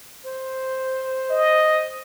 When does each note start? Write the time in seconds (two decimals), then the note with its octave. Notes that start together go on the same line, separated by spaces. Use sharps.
0.24 C5
1.30 D#5